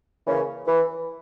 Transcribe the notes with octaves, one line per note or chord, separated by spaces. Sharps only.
C#3 E3 A#3 C#4
E3